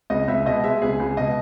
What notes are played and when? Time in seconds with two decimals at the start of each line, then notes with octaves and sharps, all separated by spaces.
0.10 C#2 D#5
0.28 C#2 E5
0.46 B2 D#5
0.63 G#3 E5
0.82 C#2 G#4
1.00 C#2
1.17 B2 D#5